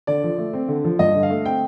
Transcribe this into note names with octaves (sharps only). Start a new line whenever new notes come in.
D3 D5
F3
A3
C4
D3
F3
G2 D#5
D3
F5
A3
C4 G5